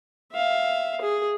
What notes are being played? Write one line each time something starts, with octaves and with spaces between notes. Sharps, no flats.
E5 F5
G#4